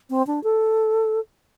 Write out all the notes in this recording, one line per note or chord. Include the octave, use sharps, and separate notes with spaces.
C4
D4
A4